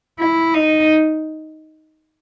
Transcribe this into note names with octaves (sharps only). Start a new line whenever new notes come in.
E4
D#4